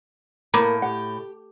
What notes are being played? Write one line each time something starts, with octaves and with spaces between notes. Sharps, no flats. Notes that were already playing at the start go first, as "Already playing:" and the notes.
A2 A#3 A#5 B5 D6
G4 F#5